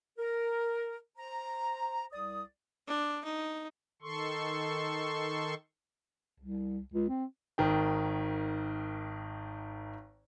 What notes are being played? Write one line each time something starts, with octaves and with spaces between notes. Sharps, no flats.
A#4
C5 A#5
C2 D5 D#6
D4
D#4
D#3 A4 C6 C#6
C2
C#2
C4
G#1 D#3 G5